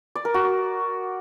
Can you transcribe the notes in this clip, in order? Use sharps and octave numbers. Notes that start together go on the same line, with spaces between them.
D5
A#4
F#4